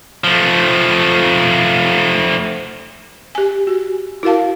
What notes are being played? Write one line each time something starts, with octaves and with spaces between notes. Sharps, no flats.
F3 A3
G4 G#5
F#4
E4 F#4 A#4 F5 A5